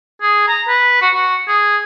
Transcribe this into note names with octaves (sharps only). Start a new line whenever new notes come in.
G#4
A#5
B4
F#4
F#4
G#4